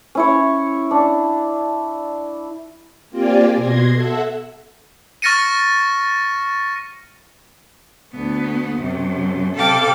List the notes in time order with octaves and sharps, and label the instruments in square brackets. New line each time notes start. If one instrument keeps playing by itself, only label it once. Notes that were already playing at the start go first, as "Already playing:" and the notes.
[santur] C#4 E4 C#5
D4
[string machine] A#3 C4 F4 G4 D5 G#5
B2 C6 G#6 A#6
A4 E5 F#5
[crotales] C#6 F6 A6 A#6 C#7 D#7
[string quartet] D2 B3
F#2 C3
C3 A4 F5 G5 D6